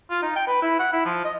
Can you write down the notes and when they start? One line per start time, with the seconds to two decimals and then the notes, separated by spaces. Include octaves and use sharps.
0.10 F4
0.22 D#4
0.36 G5
0.47 B4
0.62 E4
0.79 F#5
0.92 E4
1.05 F3
1.24 D#5